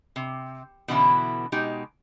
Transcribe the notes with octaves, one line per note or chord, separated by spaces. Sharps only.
C3
B2 D3 E3 B3 C#4 E4
B2 G#3 D#4 G4